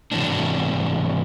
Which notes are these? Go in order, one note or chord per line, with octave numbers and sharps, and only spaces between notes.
G#2 C3 E3 F#3 A3 D4